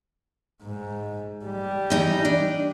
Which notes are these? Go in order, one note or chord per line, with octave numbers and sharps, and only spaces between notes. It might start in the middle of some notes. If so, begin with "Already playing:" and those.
G#2
G3
E3 D#4 D#5
D4